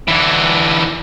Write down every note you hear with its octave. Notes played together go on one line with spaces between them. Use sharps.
D3 E3